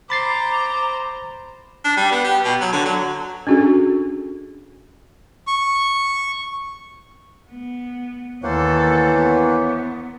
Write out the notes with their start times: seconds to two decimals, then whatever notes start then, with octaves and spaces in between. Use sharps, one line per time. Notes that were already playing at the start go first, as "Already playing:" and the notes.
0.10 C5 A#5 B5 D6 A6 C7
1.85 D4
1.97 G3
2.12 B3
2.24 G4
2.44 B2
2.61 F#3
2.73 D3
2.85 F#3
3.47 C#4 D4 F#4 G#4 A4
5.47 C#6
7.50 B3
8.43 D#2 E3 A#3 A4 C5 C#5 F#5
9.17 B3